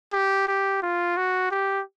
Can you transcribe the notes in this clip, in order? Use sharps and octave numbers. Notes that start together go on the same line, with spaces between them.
G4
G4
F4
F#4
G4